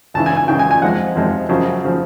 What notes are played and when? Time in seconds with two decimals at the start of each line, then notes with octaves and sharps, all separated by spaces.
0.14 C#2 C#3 E3 A5
0.26 G#5
0.37 G#5
0.48 C#2 C#3 E3 G5
0.59 G#5
0.71 G#5
0.81 F2 C3 F3 G#3 F#5
1.15 F2 C3 F3 G#3
1.49 F#2 C#3 F3
1.84 C#3 F3